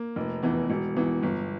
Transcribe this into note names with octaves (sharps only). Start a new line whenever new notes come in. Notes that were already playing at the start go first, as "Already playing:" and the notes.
Already playing: A#3
F1
E2 E3
E1
E2 E3
G1